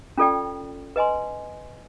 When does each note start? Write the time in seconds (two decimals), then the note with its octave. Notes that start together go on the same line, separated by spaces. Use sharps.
0.18 C#4 F4 A4 D5 G5
0.96 B4 D#5 G#5 C6